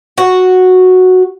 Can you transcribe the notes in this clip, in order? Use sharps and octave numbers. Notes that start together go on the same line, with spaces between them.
F#4